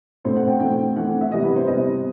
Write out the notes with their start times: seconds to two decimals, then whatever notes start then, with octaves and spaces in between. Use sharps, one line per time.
0.25 B2 A3 C4 C5
0.36 F#5
0.48 G5
0.60 E3 A3 C4 G5
0.96 E3 A3 C4 F#5
1.21 E5
1.32 C3 E3 G3 B3 D#5
1.43 B4
1.56 C5
1.67 C3 E3 G3 B3 D#5